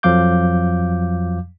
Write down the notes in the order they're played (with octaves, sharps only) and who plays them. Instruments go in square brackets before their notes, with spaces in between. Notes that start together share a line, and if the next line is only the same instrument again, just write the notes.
[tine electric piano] F2 F3 F#3 F5 D6 G6